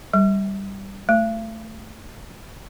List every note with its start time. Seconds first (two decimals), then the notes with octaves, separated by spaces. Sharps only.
0.13 G3
1.09 A3